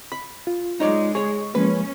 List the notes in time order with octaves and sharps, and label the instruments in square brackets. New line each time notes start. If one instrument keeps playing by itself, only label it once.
[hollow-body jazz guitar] B5
[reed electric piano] F4
[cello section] G#3 [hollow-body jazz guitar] D#4 C#5 D5
[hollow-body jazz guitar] G#4 C#5 [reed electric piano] C#6
[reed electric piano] F3 G#3 A#3 [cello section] C#4 [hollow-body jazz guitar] B4